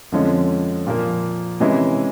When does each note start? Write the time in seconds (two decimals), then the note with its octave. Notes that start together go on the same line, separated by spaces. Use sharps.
0.12 F2 D3 F3 G#3 C#4
0.87 A#2 F3 A#3
1.60 C3 E3 G#3 C#4 E4